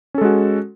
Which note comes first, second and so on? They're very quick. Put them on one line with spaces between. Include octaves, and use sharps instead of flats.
C#4 A4 G#3 F#4